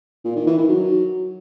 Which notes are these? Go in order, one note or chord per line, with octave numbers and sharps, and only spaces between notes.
A#2
D#3
E3
D#3
F#3